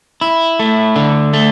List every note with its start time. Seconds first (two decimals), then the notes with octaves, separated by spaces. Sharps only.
0.21 E4
0.59 A3
0.96 D3
1.33 A3